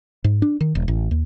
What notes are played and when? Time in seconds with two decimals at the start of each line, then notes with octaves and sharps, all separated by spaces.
0.24 G#2
0.42 D4
0.61 D#3
0.75 E1
0.88 A1
1.11 D#2